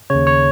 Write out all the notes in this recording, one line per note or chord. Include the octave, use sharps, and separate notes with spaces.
D#2 C#3 C#5
C#5